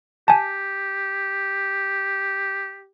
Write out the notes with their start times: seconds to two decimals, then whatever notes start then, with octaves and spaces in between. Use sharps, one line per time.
0.28 G4 G#5 A5